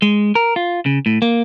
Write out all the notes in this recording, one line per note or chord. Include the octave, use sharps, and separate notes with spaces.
G#3
A#4
F4
C#3
A2
A#3